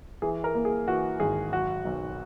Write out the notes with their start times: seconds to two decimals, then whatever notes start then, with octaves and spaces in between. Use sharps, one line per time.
0.22 E3 G#4
0.44 A#4
0.55 A#3
0.65 G#4
0.88 E3 F#4
1.20 G#1 G#4
1.52 F#3 F#4
1.85 B1